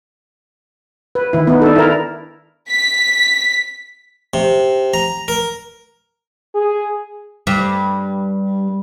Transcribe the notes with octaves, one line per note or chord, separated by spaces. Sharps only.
B4
D#3 E4
B3 D#4
D4 A4
E4 A#4
B6
C3
A#5
A#4
G#4
G2